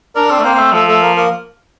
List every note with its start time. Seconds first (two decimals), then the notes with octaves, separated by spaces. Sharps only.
0.15 D4 A#4 D5
0.30 C4
0.39 A3
0.44 A#3 C4 C5
0.54 A#3
0.59 A3
0.73 F3 A3 A4
0.87 A3 A4
1.01 A#3 A#4
1.16 A#3 A#4